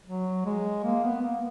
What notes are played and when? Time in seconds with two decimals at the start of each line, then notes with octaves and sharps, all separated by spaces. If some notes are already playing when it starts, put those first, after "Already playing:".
0.06 F#3
0.45 G#3
0.84 A#3
1.03 B3
1.22 A#3